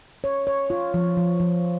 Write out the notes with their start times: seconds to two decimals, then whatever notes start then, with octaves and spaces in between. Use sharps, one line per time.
0.24 C#5
0.47 C#5
0.70 F4
0.94 F3
1.17 F3
1.40 F3